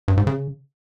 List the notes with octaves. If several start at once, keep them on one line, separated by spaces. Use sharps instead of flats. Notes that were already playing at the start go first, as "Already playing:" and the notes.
G2
G#2
C#3